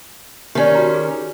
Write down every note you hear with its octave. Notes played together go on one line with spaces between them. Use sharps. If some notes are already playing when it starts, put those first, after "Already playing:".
D#3 C#4 G4 D5
F#4 A#5
G#4